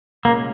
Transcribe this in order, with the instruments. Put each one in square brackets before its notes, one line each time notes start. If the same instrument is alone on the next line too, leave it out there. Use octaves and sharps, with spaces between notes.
[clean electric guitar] C2 A#2 G#3 C#4 [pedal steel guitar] A#3